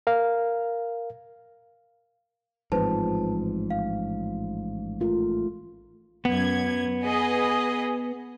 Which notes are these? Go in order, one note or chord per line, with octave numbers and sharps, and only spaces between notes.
A#4 F5
A1 G#2 F3 C4 B4 C5 A5
F5
A3 F4 A#4
F#2 B3 G#6
G#4 B4 D#5